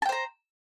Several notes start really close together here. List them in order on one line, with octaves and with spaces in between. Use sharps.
A5 G5 C5 A#5